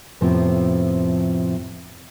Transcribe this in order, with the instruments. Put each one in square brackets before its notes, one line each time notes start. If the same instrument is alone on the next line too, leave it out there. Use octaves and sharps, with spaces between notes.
[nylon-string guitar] F2 A2 C3 F3 B3 C4